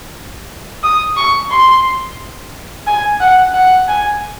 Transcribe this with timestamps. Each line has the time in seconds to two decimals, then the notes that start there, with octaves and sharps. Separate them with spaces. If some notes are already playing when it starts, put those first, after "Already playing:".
0.83 D#6
1.17 C#6
1.51 C6
2.87 G#5
3.21 F#5
3.54 F#5
3.88 G#5